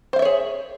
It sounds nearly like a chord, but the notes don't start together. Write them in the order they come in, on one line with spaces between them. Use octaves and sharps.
C5 F5 E5 C#5 G#4